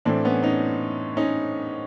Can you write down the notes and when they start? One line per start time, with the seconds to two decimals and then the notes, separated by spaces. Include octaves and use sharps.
0.05 A2 E3 C4 D4
0.25 B3 C#4
0.43 C#4 D#4
1.17 C#4 D#4